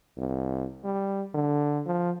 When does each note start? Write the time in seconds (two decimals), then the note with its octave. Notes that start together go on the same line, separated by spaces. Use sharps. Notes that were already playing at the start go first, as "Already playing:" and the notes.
0.18 C2
0.84 G3
1.35 D3
1.86 F3